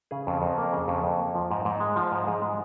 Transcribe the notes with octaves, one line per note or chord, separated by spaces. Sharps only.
C#3 G#4
F2
F2 A#4
A#3 A#4
C#3 G#4
F2
F2
A#3
F3
G#2
G#2
G#3
F3
G#2
G#2 G#4
G#3